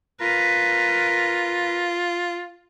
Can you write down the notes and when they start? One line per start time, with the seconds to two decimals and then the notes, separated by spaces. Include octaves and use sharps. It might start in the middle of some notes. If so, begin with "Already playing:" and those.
0.21 F4 A#4 B4